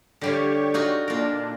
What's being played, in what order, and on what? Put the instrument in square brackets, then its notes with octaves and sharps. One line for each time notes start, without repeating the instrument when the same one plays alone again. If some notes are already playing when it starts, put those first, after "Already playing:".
[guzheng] D3 G3 F5 [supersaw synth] G4 C#5
[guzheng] D#4 F4 F#4
[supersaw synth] A#2 D4 [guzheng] F4 A#4